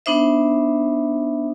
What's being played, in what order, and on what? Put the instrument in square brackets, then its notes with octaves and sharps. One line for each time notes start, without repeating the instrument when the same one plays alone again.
[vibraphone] B3 D4 D#4 C5 E5